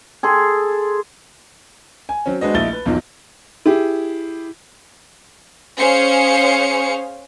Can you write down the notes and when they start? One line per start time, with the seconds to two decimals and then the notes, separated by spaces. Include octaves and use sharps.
0.23 G#4 A4 C6
2.09 G#5
2.26 F#3 C4 C#4
2.41 G#3 B3 D4 F#4 C5 D#5
2.54 A#1 A3 E4 D#5 A6 G7
2.73 B4
2.86 B1 E2 A#2 F#3 D#4
3.66 E4 G4 G#4
5.77 C#4 G#4 C5 C#5 F5 C#7